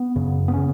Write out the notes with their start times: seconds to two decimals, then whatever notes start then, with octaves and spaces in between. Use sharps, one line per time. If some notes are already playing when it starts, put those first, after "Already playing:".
Already playing: B3
0.16 F#2 C#3
0.48 B3
0.54 C#3 C#4